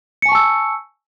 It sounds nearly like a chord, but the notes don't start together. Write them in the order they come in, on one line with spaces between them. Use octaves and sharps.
C#7 G#5 C#6 A5 E6